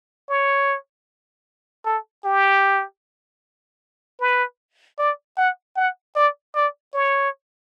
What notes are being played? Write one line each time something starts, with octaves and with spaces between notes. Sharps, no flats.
C#5
A4
G4
B4
D5
F#5
F#5
D5
D5
C#5